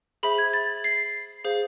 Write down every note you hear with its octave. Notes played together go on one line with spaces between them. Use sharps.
G#4 C5 E5 B5
G#6
A6
C7
G#4 C5 F5